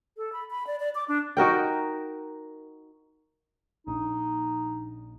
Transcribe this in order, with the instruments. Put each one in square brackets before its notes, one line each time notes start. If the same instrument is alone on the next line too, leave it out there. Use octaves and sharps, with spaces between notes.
[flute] A4
B5
B5
D5
D5
D6
D4
[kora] D#4 F#4 A#4 G5
[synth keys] A#1 [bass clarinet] D#4